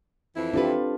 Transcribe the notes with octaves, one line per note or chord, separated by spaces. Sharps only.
F2 E3 E4
C4 D4 F4 G4 A4 B4